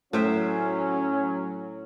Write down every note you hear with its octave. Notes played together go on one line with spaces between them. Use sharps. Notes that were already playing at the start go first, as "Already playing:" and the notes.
A2 F#3 C#4 C5 E5